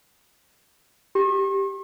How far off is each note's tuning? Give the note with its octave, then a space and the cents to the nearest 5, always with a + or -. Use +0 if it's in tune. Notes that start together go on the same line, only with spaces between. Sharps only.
G4 +0 C#6 -45